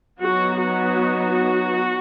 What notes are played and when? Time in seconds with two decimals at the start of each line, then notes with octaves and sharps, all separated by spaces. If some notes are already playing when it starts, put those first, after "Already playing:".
0.21 F#3 B3 D#4 F#4
0.60 F#4